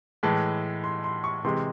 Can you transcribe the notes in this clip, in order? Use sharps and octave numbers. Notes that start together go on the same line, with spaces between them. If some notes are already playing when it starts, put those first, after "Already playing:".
A2 E3 G#3 A5
C6
C6
C#6
C3 E3 G#3 C6